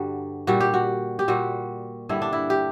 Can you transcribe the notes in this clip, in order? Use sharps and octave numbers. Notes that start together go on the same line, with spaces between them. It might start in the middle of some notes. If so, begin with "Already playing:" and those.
Already playing: G2 D3 G3 F#4
A#2 G3 F#4
G4
F#4
G4
A#2 G3 F#4
G2 D3 G3 E4
D4
E4
G4